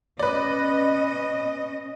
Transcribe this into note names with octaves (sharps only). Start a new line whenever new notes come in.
C#4 B4 D5 D#5